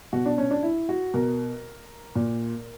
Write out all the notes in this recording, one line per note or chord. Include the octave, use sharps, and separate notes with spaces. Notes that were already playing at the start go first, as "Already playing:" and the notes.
B2 F#4
D4
C#4
D4
E4
F#4
B2 A#4
A#2